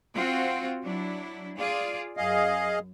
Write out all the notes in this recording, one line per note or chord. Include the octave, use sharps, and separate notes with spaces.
C4 F4 F#4
F#3 D4 E4
F4 G#4 D5
F#2 G#4 D#5 F5